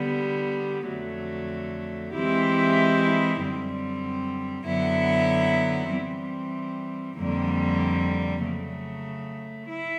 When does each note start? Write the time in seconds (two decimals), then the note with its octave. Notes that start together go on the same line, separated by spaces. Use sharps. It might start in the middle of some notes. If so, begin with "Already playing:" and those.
Already playing: D3 G3 B3
0.88 F2 D3 F#3 A3
2.13 E3 G#3 C4 E4 G4
3.39 F#2 D3 G3 C4
4.65 F#2 D3 F#3 B3 E4
5.91 E3 G3 C4
7.17 F2 D3 G3 A#3
8.43 C#3 F#3 A3
9.69 E4